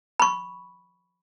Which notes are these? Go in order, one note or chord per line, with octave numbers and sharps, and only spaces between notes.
B5 C#6